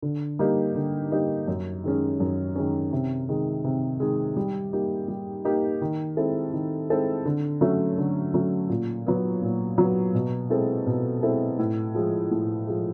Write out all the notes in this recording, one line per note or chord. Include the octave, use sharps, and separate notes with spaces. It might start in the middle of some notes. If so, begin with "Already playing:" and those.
D3
G3 A#3 D#4 G4
D3
G3 A#3 D#4 G4
F#2
D#3 G#3 C#4
F#2
D#3 G#3 C#4
C3
D#3 G#3
C3
D#3 G#3
G3
A#3 D#4 G4
G3
A#3 D#4 G4
D#3
G#3 C4 E4 A4
D#3
G#3 C4 E4 A4
D3
F#3 A3 C#4
D3
F#3 A3 C#4
A#2
F#3 B3
A#2
F#3 B3
B2
G#3 C4 E4 A4
B2
G#3 C4 E4 A4
A2
F3 G#3
A2
F3 G#3